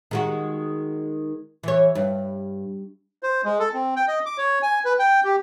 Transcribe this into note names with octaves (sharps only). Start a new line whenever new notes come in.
D#3 G#3 F#4
E3 C#5
G2
C5
G#3
A4
C4
G5
D#5
D6
C#5
G#5
B4
G5
G4